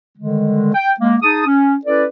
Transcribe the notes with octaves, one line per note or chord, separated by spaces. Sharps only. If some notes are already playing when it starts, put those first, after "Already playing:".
D3 D#3 G3 G#3
G5
G#3 A#3
D#4 G#4 A5 D#6
C#4
C#4 E4 A4 B4 D5